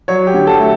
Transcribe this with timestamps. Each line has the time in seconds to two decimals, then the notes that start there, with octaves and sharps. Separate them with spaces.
0.08 F#3 C#5
0.27 G4
0.34 D3
0.47 A4
0.59 A3